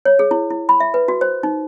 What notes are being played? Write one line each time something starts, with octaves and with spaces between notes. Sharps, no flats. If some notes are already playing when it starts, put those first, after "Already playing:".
C#5
G#4
E4
E4
B5
E5
B4
F#4
C5
D#4